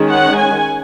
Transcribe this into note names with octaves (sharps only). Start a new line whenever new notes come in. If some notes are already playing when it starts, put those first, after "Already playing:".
Already playing: D#3 G#3 C#4
F#5
G#5